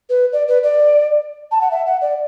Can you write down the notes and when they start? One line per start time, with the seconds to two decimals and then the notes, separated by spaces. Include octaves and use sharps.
0.10 B4
0.33 D5
0.48 B4
0.63 D5
1.52 A5
1.61 F#5
1.71 E5
1.86 F#5
2.02 D5